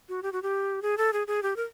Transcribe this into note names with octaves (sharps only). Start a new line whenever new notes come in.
F#4
G4
F#4
G4
G#4
A4
G#4
G#4
G4
A#4